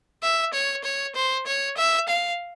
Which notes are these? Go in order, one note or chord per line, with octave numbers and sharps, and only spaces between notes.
E5
C#5
C#5
C5
C#5
E5
F5